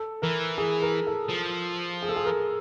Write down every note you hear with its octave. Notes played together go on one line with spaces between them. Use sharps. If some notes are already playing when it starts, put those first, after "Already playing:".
Already playing: A4
E3 A#4
G#4
A#4
A4
F3
G#4
A4
G#4
A#4